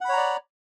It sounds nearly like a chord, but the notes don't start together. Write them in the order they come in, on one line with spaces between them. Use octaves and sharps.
F#5 B5 C#5 A#5 D5